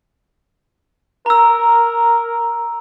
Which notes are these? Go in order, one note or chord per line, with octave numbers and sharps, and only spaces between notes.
A#4 A#5 E6